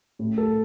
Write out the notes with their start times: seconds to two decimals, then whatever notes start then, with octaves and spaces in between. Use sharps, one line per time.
0.19 A2
0.38 A4